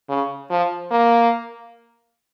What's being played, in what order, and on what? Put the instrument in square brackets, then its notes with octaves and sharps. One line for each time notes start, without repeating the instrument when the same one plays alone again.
[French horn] C#3
F3
A#3